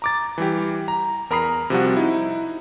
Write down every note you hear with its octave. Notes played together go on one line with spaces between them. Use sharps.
A#5 D6 A6
E3 G3 G4
A#5
E2 A#4 A#5 B5 D#6 C7
C3 F3 G3 F#4
D#4 E4